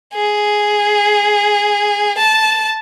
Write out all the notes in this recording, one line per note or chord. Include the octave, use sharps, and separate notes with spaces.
G#4
A5